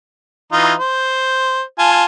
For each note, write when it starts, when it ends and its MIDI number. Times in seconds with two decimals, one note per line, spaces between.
0.52 0.73 52
0.52 0.73 63
0.52 0.73 65
0.79 1.61 72
1.79 2.05 65
1.79 2.05 80
1.79 2.05 81